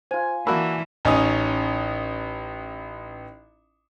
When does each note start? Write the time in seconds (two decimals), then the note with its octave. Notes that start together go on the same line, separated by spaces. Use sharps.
0.11 F4 C5 G#5
0.47 E3 A#3 D4 F#4 A5 B5 E6
1.05 A1 C#4 D#4 D#6